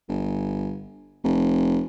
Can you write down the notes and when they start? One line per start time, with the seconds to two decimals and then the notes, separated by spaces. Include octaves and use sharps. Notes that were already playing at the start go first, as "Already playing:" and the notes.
0.08 G1
1.23 F1